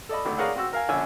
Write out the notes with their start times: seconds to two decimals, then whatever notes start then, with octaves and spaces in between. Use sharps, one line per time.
0.09 A4 D5 D#5 B5
0.25 G#1 D3 A3 D6
0.38 G#4 A#4 C#5 D5 F5 F#5
0.56 C4 F#4 E6
0.73 A#4 F5 G#5
0.89 A#1 D3 C#4 G#5 E6